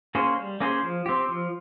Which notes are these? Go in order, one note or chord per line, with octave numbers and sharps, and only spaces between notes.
A#3 C#4 G#4 C5
G3
A#3 C#4 G#4 C5
F3
C4 G4
F3